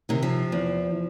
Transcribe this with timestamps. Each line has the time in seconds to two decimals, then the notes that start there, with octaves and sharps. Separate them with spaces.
0.09 C3 D#3
0.23 F3
0.52 E2